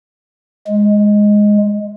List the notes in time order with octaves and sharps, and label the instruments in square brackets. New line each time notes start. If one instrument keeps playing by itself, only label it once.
[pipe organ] G#3